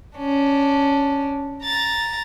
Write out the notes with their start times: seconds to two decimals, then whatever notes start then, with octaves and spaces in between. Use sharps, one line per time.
0.18 C#4 D4
1.64 A#5 A6